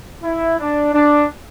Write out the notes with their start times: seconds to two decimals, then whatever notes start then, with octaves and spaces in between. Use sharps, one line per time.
0.23 E4
0.59 D4
0.93 D4